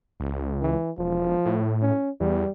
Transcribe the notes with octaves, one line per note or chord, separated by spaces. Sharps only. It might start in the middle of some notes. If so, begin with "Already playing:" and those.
C#2
E3
E1 F3
A2
C#4
E2 G3